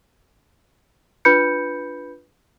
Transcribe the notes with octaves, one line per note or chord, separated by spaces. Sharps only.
D4 F4 B4 B5 G6 C#7